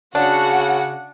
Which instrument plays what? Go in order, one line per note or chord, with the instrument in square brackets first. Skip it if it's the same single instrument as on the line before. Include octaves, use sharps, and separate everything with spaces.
[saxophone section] C#3 [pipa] D4 [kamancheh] F#4 [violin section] F#5